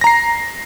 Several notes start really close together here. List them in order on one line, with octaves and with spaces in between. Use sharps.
A#6 A#5 C7